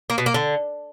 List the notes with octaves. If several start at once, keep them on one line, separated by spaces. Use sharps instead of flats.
A#3
B2
A#3
D3